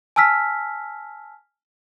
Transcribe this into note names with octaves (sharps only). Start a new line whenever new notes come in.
G#5 A5 E6 F6 B6